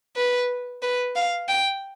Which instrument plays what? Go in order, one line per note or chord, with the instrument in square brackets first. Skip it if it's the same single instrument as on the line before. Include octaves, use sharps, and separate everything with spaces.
[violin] B4
B4
F5
G5